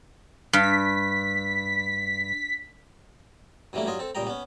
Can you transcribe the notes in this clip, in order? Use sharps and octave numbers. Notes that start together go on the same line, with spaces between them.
G2 B6
F#2 E3 G3 A3 A#3 E4
G2 F#3 F4 D#5 G#5
C4 A4
C#2 A#2 G3 D#5 G5 A#5
B3 C#4